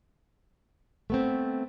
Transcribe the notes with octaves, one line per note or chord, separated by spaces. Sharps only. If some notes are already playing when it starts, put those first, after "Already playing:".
A3 B3 C4